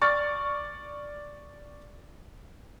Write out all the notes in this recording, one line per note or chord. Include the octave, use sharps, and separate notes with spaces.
D5 C#6 F6 A6